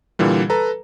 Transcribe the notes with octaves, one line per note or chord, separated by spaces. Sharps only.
A#2 D3 E3 G3
A4 B4 A#5